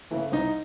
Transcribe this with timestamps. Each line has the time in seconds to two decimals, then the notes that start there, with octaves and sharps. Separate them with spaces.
0.11 C#3 E3 A3
0.32 C2 D#4